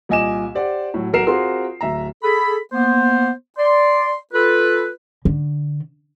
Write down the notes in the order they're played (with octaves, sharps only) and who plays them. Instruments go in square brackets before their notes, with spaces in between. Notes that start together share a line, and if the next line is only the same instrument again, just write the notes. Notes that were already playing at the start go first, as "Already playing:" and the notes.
[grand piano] C2 A#2 D#5 G#5 D6 E7
G4 C5 D5 F#5
A2 F#3
B1 F#4 A#4 C7 E7
C4 F4 F#4 G#4 A#4 C6
D1 E5 A#5
[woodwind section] G#4 A4 B5
A#3 B3 C5
D5 C6
F4 A4 B4
[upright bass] D3